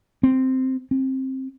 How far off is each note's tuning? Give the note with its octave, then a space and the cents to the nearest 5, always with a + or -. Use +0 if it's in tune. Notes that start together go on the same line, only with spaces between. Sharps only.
C4 -5
C4 +15